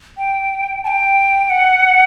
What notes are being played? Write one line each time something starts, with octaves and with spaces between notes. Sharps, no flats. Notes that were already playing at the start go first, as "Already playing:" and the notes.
G5
A5
G5
F#5